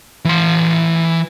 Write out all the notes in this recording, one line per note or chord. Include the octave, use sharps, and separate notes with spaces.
E3 C6